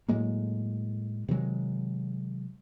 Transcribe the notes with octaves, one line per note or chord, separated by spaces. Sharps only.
A2 F#3 G#3 A#3
C3 D#3 F#3 G#3